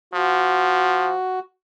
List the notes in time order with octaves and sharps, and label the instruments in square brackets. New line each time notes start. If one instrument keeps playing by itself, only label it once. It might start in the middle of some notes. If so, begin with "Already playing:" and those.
[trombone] F3 [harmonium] F#4